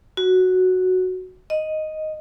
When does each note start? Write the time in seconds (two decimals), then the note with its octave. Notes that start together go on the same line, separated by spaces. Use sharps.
0.17 F#4
1.50 D#5